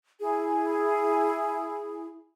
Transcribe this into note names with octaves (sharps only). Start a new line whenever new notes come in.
E4 G#4